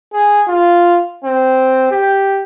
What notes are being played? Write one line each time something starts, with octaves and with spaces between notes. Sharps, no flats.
G#4
F4
C4
G4